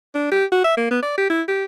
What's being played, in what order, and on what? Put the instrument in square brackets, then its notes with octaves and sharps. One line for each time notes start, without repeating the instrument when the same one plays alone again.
[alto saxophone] D4
G4
F#4
E5
A#3
B3
D5
G4
E4
G4